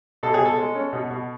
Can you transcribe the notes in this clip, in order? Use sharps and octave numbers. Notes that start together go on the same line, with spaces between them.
B2 A4
G#4
B2
A4
G#3
C#4
B2
B2